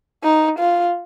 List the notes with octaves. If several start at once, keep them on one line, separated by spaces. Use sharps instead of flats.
D#4
F4